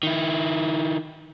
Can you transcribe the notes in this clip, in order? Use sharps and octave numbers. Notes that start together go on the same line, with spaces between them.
D#3 E4